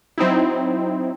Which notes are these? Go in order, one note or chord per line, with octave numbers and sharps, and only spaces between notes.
F#3 C4 D#4 E4